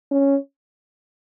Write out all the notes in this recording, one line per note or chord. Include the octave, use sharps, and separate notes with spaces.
C#4